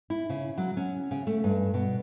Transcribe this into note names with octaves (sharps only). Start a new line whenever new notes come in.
E4
C#3
F#3
C#4
C#3
A3
G2
B2